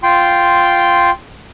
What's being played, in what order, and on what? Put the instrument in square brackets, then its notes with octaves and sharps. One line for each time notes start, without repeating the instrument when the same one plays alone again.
[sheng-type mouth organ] F4 G5 C6